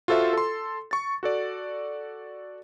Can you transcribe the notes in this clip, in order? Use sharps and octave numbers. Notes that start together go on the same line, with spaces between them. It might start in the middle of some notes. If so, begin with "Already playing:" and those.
F4 F#4 A4 C5 E5
A4 C6
C#6 A6
F#4 A4 D5